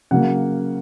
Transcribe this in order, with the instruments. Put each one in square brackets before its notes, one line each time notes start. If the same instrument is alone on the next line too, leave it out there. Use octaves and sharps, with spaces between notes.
[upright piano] C#3 F#3 A#3 F#5